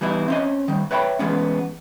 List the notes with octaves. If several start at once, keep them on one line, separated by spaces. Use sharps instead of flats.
E3 G3 B3 D#4 E4
C4 C#4 D#5
D#3 G3
B4 C#5 E5 G5 A#5 B5
E3 G#3 B3 C#4